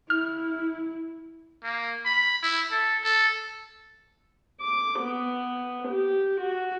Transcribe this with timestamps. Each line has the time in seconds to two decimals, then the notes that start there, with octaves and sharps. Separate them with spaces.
0.10 E4 F6
1.63 A#3
2.05 B5
2.42 E4
2.71 A4
3.04 A4
4.61 D6
5.01 B3
5.88 G4
6.40 F#4